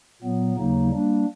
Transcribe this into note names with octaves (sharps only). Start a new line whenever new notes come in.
A#2 F#3 B3
D#2 C#3 F#3 A#3 D#4
G3 A#3 D4